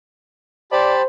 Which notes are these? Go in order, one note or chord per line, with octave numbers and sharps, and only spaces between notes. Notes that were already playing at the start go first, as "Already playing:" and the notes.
G4 C5 D5 A5 B5